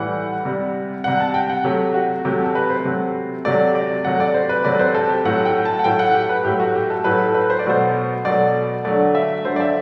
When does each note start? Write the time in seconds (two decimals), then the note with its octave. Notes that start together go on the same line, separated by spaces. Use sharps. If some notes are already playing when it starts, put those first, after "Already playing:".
Already playing: A2 E3 G3 F#5
0.45 C3 G3
1.04 C3 G3 F#5
1.20 A5
1.34 G5
1.50 F#5
1.64 C3 F#3 A3 G4
1.94 F#4
2.25 C3 F#3 A3 G4
2.44 A4
2.55 B4
2.70 C5
2.85 C3 F#3 A3
3.45 C3 F#3 A3 D5
3.75 D5
4.05 C3 F#3 A3 F#5
4.20 D5
4.34 C5
4.49 B4
4.65 C3 F#3 A3 D5
4.74 B4
4.79 C5
4.95 A4
5.09 G4
5.25 A2 F#3 A3 F#5
5.45 G5
5.65 A5
5.79 F#5
5.84 A2 F#3 A3 G5
5.99 F#5
6.15 G4
6.29 B4
6.44 A2 F#3 A3 G4
6.60 F#4
6.75 G4
6.90 A4
7.04 A2 F#3 A3 B4
7.20 A4
7.34 B4
7.50 C5
7.59 D5
7.65 B2 F#3 A3 C5
8.25 B2 F#3 A3 D5
8.85 D3 F#3 A3 D5
9.15 E5
9.45 D3 F#3 A3 C5
9.56 D5
9.60 E5